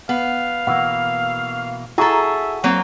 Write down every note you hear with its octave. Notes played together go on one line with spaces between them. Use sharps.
B3 F5
B2 E3 A#3 F#5
E4 F#4 G#4 A4 E5 A#5
F#3 A#3 C4